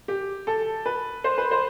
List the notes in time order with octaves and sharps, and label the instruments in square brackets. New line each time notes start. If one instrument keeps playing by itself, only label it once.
[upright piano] G4
A4
B4
C5
B4
C5